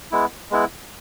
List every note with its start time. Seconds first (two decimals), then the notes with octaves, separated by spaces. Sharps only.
0.11 G#3 B3 E4
0.51 G#3 B3 E4